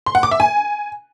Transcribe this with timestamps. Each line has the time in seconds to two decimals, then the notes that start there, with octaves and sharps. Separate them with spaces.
0.06 C6
0.15 F#5
0.23 D6
0.31 E5
0.40 G#5